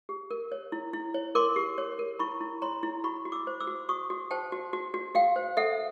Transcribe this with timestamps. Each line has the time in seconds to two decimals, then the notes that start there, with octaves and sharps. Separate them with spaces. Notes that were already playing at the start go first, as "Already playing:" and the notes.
0.09 G4
0.31 A#4
0.52 C#5
0.72 E4
0.93 E4
1.14 C#5
1.35 A#4 C6 D6
1.56 G4
1.78 C#5
1.99 A#4
2.19 E4 B5 C#6
2.41 E4
2.62 C#5 A#5 C6
2.83 E4
3.04 F#4 B5 C#6
3.25 F#4
3.32 D6 E6
3.47 C5
3.60 D6 E6
3.67 F#4
3.89 F#4 C#6 D#6
4.10 F#4
4.31 C5 G5 A5
4.52 F#4
4.73 F#4
4.94 F#4
5.15 F#4 F5 G5
5.36 C5
5.57 A4 E5 F#5